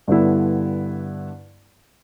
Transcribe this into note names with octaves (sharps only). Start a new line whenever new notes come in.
G2 D3 B3 E4